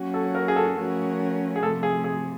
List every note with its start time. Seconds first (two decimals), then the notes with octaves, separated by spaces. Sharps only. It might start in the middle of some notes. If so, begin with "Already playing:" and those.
Already playing: F#3 A#3 C#4 F#4
0.14 A4
0.35 A#4
0.48 G#4
0.56 A4
0.77 F3 A3 C#4 F#4 A#4
1.56 G#4
1.62 C3 F3 A3 A4
1.83 G#4
2.04 G#4